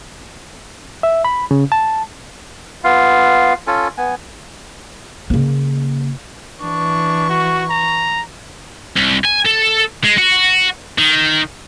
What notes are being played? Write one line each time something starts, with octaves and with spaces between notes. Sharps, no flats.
E5
B5
C#3
A5
B3 F4 F5
C#4 F4 A4 G#5
B3 G#5
C#3 A#3
E3 D4 C#6
F#4
A#5
C2
G#5
A4
G#3
F#4
D#3